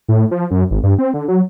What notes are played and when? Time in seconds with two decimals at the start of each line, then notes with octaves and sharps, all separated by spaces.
0.08 A2
0.31 F3
0.51 F#2
0.71 G#1
0.83 G2
0.98 C4
1.14 D3
1.28 F#3